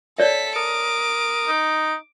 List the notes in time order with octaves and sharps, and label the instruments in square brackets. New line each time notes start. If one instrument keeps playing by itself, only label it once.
[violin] A4 B6 [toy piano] C#5 D5 E5
[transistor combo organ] A#4 D#6 [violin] D6
[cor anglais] D#4